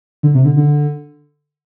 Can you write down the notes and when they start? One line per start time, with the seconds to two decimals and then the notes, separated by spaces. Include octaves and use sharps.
0.23 D3
0.35 C3
0.45 D3
0.57 D3